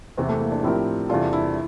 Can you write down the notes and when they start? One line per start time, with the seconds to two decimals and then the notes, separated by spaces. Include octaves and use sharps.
0.17 E2 C3 E3 C4
0.29 A3
0.41 A#3
0.52 D4
0.63 A2 F3 C4 E4 G4 A#4
1.10 E2 C3 G3 D4 F4 A4
1.33 E4